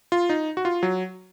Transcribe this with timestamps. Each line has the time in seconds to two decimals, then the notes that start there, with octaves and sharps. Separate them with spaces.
0.12 F4
0.29 D#4
0.57 F#4
0.65 F4
0.83 F#3